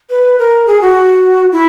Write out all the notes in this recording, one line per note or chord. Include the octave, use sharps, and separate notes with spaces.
B4
A#4
G#4
F#4
E4